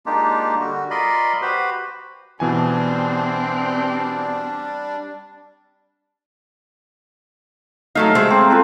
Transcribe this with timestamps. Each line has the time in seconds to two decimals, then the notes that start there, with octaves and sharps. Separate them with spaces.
0.06 G#3 A#3 D4 D#4 F4 G4
0.60 D3 G3 F#4
0.91 F4 A#4 D5 D#5 B5 C6
1.42 F#4 G4 B4 C5 B5
2.40 B2 E3 G3 C4 D4 G#5
7.95 F#3 A3 D#4 F5
8.15 G#3 A3 C5
8.30 A#3 C4
8.50 F4 A4 B4